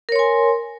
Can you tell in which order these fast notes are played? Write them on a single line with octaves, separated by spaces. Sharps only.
A#4 C#5 C6 G#5